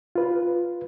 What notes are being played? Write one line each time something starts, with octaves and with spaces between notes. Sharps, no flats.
F4 B4